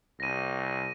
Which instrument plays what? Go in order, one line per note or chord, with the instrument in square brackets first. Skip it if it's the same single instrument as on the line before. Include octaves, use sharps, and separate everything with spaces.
[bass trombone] C2 [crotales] A#6 D#7